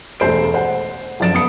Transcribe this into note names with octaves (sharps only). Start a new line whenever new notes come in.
E1 A3 C5 D7
C5 F#5
F#1 F2 D5 A6 D7 E7
B3 D#6 C#7